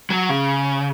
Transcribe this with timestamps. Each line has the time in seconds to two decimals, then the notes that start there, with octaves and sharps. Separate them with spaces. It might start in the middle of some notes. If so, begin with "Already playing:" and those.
0.10 F#3
0.29 C#3